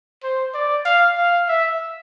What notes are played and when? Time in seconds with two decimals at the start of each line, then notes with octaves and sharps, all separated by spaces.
0.23 C5
0.54 D5
0.85 F5
1.17 F5
1.48 E5